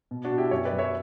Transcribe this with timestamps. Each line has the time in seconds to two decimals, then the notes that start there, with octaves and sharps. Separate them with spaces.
0.11 B2
0.25 D4 F#4
0.30 B2
0.38 E4 G4
0.51 F#2 C#5 E5
0.65 B4 D5
0.72 F#2
0.78 C#5 E5